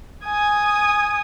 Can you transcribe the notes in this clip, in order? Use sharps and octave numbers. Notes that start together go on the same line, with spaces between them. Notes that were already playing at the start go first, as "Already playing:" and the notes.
G#5 D#6